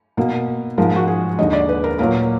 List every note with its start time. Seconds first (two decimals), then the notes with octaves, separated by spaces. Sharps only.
0.17 B2 A#3
0.78 G#2 F3 G#3 A#4
0.96 F#4
1.08 G#4
1.38 D#2 D3 G#3 D#5
1.53 D5
1.69 B4
1.84 A#4
1.99 A#2 F#3 A#3 A#4